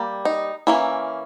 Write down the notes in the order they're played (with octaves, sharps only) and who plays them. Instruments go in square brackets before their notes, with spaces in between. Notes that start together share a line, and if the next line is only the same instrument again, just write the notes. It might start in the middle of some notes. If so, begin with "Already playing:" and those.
Already playing: [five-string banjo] G3 A#3
D#4
E3 A#3 C#4 E4